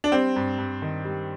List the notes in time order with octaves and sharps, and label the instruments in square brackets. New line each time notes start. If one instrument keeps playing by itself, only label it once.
[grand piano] D4
G3 C4
G2
G2
D#3
G3